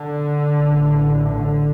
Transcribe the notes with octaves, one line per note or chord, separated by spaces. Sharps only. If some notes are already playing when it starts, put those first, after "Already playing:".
Already playing: D3
A1 A2
D3